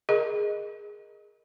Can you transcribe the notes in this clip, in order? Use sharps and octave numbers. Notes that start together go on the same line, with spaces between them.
G#4 A#4 D#5